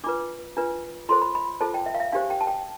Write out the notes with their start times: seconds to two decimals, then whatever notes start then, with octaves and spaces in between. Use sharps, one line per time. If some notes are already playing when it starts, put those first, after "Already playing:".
0.04 D4 F4 B4 D6
0.57 D4 F4 B4
1.09 F4 A4 C5 C6
1.22 B5
1.35 B5
1.61 F4 A4 C5 A5
1.74 G5
1.86 E5
1.94 F5
2.00 E5
2.12 D4 G4 C5 F5
2.30 G5
2.41 A5
2.47 G5